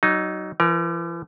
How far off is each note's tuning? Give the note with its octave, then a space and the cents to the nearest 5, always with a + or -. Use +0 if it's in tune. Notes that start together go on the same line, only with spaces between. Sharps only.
F#3 +25 D#4 -5
E3 +45 A#4 +25